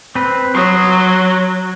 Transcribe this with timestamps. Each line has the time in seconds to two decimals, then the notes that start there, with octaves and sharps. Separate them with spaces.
0.15 C4 B4
0.55 F#3 C6 D#6